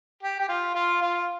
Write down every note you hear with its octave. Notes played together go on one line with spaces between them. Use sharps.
G4
G4
F4
F4
F4